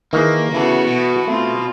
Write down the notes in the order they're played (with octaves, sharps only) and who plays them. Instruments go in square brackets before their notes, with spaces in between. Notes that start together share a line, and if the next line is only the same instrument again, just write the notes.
[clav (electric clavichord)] D#3 E3 G#4 [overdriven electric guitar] A#3
[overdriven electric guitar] C#3 [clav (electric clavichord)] E3 A4 [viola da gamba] B3 E4 F#4
[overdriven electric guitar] B2
[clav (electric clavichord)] A3 [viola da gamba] C4 F4